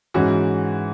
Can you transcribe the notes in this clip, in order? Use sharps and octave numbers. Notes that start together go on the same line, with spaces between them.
G#2 E3 C#4 F#4